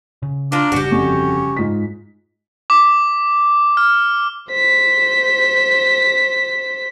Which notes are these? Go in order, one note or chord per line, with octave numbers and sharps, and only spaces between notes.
C#3
A#3 D4 F4
G1 G2 C#3 F#4 G4
F2 C#4
G#2 F4 B6
D6
F6
C5 B6